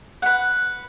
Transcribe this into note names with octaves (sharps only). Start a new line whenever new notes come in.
B4 F#5